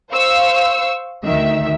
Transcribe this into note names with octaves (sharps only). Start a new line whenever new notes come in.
C5 F5 C#6 E6
D2 D#3 E5